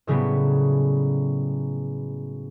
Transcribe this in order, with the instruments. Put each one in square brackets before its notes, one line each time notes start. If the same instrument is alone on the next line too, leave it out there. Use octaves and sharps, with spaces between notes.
[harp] A2 C#3 F#3 G3 B3